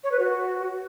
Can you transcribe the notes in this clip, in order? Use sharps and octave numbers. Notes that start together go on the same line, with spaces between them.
C#5
B4
F#4